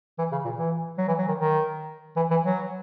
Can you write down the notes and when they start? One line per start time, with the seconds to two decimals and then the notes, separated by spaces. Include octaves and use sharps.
0.18 E3
0.32 C#3
0.45 A#2
0.58 E3
0.98 F#3
1.08 E3
1.18 F#3
1.27 D#3
1.38 D#3
2.17 E3
2.30 E3
2.44 F#3